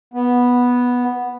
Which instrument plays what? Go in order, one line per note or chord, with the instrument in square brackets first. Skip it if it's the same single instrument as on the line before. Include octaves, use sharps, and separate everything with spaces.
[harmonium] B3